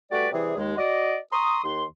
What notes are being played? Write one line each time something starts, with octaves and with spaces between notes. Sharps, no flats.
G3 A3 F#4 B4 D5
C3 E3 G3 G#4
D#2 G#3
F#4 D5 D#5
A#5 C6 C#6 D#6
D#2 C6